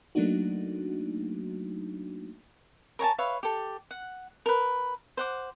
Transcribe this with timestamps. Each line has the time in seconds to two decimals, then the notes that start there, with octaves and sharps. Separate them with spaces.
0.15 F#3 A3 A#3 D4 D#4 F#4
2.99 A#4 C#5 G#5 A5
3.18 B4 C#5 E5 F5
3.43 G4 A4
3.91 F#5
4.46 A#4 B4
5.17 C5 F#5 D6